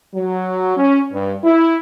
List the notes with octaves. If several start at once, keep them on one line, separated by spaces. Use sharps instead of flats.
F#3
C#4
G2
E4